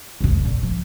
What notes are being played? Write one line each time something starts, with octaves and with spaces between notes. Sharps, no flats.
F1 A2
A#2
F3